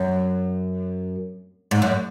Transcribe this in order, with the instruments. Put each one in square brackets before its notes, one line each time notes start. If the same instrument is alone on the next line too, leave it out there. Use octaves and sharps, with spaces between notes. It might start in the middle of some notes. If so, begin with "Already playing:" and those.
Already playing: [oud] F#2
G#2
F#2